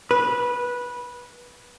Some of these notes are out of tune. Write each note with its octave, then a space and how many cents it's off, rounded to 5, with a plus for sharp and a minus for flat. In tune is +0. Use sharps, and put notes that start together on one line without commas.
B4 -15